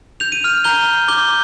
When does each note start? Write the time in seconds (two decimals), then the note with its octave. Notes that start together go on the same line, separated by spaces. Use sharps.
0.20 G6 F7
0.32 D#7
0.44 F6 F7
0.64 A#5 G6 G7
1.08 D6 G6 G7